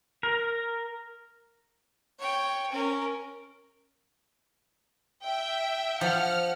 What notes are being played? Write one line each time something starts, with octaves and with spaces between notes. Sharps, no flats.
A#4
C#5 G5
C#4 A#4
E5 G5
F3 F#5 F6